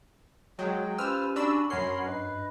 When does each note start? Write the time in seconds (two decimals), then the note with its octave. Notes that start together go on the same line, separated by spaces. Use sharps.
0.59 F#3 G#3 G5
0.98 C#4 F4 G4 B4 C5 G#5 E6 F6
1.36 D4 F#4 B5 E6
1.70 F#2 A#4 C#5 F#5 G#5 B5 C6 C7
2.06 G2 B4 D#5